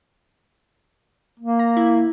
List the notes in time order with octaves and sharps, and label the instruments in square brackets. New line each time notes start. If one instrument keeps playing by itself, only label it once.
[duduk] A#3
[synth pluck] A#5
E4